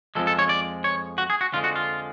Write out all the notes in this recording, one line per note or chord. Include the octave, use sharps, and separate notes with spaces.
F2 F3 G#3 A4
A4
C#5
D5
C#5
F#4
G#4
F#4
F2 D3 F3 G#3 F4
F#4
F4